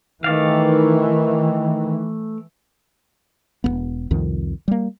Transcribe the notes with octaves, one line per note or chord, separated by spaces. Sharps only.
D#3 E3 A3 D5 F5
E1 E2 B3
C2 F2 D#3
G3 A#3